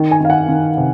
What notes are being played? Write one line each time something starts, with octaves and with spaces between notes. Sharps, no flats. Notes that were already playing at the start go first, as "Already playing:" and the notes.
Already playing: D#3
G#5
D#3 F5
F#5
D#3
C3